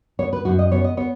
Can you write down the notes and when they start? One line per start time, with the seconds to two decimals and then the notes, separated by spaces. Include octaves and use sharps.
0.19 B3 C#5
0.33 B4
0.45 F#2 F#4
0.59 D#5
0.72 B3 C#5
0.84 D#5
0.97 B3 C#5